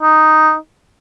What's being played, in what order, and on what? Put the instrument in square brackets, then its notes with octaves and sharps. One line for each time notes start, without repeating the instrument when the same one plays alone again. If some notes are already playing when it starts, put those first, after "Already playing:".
[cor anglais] D#4